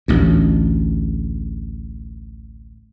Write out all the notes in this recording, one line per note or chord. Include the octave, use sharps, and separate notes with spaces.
A1 D2